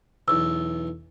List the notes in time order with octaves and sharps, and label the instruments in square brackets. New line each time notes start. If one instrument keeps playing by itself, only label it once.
[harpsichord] B1 E2 [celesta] E6